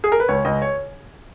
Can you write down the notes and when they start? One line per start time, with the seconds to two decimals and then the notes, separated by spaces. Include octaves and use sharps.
0.04 G#4
0.12 A#4
0.20 B4
0.28 C#2 C#5
0.45 C#2 D#5
0.62 C#5